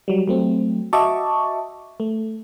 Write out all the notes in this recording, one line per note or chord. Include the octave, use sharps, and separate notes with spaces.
F#3 G3
F#3 A3 C4
F#4 D#5 E5 A5 C#6 D6
A3